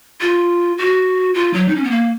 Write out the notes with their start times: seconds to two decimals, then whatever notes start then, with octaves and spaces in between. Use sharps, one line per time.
0.21 F4
0.78 F#4
1.34 F4
1.54 F#3
1.68 D#4
1.75 C#4
1.83 B3
1.91 A#3